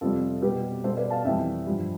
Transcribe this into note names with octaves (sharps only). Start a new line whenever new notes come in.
F2 C3 G3 F4 A4
B2 G3 G4 B4
B2 G3 A4 C5
B4 D5
F5 A5
F2 E3 G3 E5 G5
G2 F3